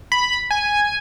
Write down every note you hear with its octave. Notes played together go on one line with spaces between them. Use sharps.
B5
G#5